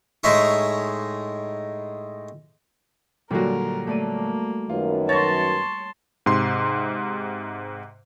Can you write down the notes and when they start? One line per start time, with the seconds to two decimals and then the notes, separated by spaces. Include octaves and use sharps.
0.23 A2 G#3 D#4 G#4 E5 C#6
3.31 A#2 D3 F#3 G3 F#4 A#4
3.87 A3 A#3 D5 D#7
4.69 F#2 D#3 F4 B4
5.09 C#5 A5 C6 C#6 A6 A#6
6.26 G#2 C3 C6